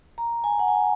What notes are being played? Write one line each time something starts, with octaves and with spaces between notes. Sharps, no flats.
A#5
G#5
F#5
G#5